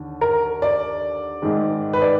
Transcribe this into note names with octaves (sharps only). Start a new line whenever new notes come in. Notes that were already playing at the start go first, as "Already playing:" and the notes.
Already playing: D#2 D3
A#4
D5
G#2 D#3 G#3
B4
D5